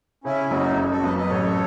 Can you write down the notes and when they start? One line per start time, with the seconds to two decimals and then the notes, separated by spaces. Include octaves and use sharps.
0.24 C#3 C#4 E4
0.50 F#1 D#4 F#4
0.77 F#1
0.90 F#4 A4
1.04 F#2 B4 D#5
1.17 B4 D#5
1.30 A1 A4 C#5